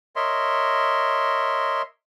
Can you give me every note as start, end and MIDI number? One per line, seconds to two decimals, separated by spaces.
0.16 1.82 70
0.16 1.82 73
0.16 1.82 75
0.16 1.82 76
0.16 1.82 84